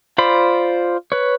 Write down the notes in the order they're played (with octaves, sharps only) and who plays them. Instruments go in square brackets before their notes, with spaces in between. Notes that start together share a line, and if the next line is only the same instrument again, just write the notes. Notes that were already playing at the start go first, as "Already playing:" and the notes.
[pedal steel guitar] F4 C5 D5 B5
B4 C#5